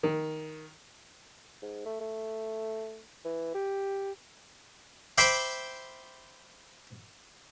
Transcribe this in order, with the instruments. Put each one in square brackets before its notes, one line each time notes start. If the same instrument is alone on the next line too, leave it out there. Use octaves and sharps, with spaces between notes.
[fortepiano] D#3
[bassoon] G#2
A3
A3
E3
G4
[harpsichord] C5 E5 G5 B5 C6 D6